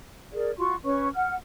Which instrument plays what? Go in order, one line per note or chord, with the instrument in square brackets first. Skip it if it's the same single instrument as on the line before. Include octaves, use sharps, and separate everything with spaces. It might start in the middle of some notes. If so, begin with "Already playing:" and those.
[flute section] G#4 A#4 D5
F4 F#4 C6 C#6
C#4 B4 C#5 C#6
F#5 F6